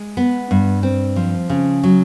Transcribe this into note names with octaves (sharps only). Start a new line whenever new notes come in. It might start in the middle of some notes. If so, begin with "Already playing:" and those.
Already playing: G#3
B3
G2
C4
F3
C#3
F#3